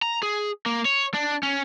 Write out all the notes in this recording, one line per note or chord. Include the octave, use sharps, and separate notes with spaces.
A#5
G#4
A#3
C#5
D4
C#4